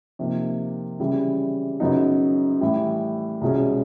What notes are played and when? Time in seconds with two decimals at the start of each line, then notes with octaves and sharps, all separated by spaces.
0.19 C3 F3 A#3 D#4
0.99 C#3 E3 G3
1.80 F#2 C#3 F#3 B3 D#4
2.61 A2 E3 G3
3.41 C2 B2 G#3 C#4